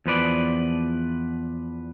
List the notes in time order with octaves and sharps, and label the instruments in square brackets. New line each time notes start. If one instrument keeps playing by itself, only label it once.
[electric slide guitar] E2 F3 B4 D5